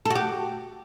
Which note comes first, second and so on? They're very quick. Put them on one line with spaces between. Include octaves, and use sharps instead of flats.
A4 F#4 G4